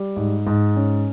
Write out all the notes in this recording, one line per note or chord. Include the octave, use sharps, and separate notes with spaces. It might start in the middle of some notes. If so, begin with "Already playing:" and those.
Already playing: G3
G#2
G#2
C#4